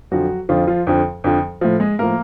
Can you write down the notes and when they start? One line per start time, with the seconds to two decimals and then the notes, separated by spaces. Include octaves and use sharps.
0.11 F2 D3 F3 F#3 F#4
0.49 F2 D3 F3 F4
0.67 F3 F4
0.87 F2 D3 F3
1.24 F2 D3 F3
1.61 A2 F3
1.80 G#3 G#4
1.99 A2 F3 A#3 A#4